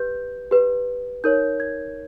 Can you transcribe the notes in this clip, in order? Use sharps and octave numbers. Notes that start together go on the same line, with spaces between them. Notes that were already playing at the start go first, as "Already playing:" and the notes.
Already playing: G4 B4 G6
G4 B4
D#4 A#4 C#5 G6
G#6